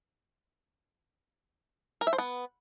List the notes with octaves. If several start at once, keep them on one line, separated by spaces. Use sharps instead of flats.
A#4
E5
C5
B3